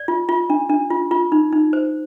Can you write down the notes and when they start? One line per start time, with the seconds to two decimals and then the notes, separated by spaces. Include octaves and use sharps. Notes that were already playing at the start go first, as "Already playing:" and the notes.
Already playing: D5
0.08 F4
0.29 F4
0.50 D4
0.70 D4
0.90 F4
1.11 F4
1.32 D#4
1.52 D#4
1.73 C5